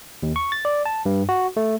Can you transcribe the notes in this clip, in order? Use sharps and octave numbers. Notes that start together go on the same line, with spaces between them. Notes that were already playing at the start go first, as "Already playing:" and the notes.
D#2
C#6
A6
D5
A5
G2
F#4
A3